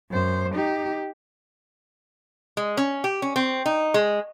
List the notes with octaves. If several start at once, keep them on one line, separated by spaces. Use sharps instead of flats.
F#2 C5
D#4 G4
G#3
C#4
G4
C#4
C4
D#4
G#3